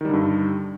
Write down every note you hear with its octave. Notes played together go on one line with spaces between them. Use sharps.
G2 D3 D#3 G3